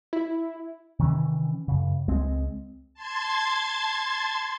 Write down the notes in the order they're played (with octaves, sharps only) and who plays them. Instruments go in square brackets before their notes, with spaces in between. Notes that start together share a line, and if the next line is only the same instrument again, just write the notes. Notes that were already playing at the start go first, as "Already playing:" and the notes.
[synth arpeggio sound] E4
[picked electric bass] C3 D#3 E3 C#4
F#2 C#3
C#2 G#3 C4
[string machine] A5 C6 G#6 A6